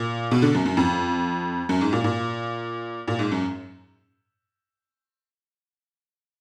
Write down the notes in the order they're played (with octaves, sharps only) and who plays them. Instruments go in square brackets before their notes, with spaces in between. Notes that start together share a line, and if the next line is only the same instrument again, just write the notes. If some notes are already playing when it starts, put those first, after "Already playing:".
Already playing: [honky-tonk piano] A#2
B2
D3
F#2
F#2
F2
F#2
G#2
A#2
A#2
A#2
G#2
F#2